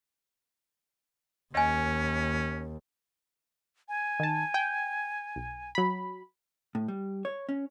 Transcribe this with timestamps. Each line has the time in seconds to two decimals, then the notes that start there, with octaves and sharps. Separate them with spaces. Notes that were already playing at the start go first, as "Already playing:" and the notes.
1.55 D#2 C#4 D#5 G#5
3.89 G#5
4.20 D#3 A5
4.54 G5
5.36 B1
5.75 F#3 B5
6.75 A2
6.88 G3
7.25 C#5
7.49 C#4